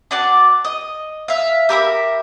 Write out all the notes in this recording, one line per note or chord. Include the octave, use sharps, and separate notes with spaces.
D4 F#4 D5 A5
D#5
E5 F5
G4 A#4 E5 B5